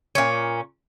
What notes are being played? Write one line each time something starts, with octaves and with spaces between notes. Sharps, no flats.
A#2 C#4